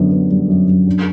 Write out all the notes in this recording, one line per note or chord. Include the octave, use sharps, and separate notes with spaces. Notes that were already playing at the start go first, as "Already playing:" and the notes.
Already playing: F#2 D3 B3
B3
G3
F#2
F#2
D4